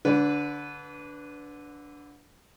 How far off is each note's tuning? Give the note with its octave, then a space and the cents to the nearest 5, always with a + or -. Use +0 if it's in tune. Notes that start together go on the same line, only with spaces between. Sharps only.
D3 -10 B4 +0 D5 -40